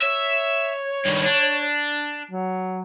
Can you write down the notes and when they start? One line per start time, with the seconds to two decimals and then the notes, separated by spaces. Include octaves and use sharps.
0.02 C#5 E5
1.05 G2 D#3
1.25 D4
2.31 F#3